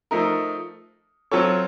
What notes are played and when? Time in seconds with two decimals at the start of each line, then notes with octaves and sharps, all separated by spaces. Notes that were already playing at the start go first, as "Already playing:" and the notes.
0.11 F3 A3 D#4 A#4
1.31 F#3 C4 F4 A4 C#5